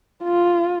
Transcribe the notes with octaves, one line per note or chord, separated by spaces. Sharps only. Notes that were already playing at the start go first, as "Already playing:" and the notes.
F4